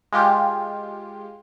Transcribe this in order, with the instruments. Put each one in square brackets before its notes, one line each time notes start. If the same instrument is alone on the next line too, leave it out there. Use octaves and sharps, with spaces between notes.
[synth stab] G#3 F4 G4